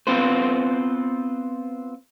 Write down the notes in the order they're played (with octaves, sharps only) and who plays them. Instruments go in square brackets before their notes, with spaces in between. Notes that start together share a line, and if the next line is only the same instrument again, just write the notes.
[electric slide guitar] B3 C4 F4 B4 C5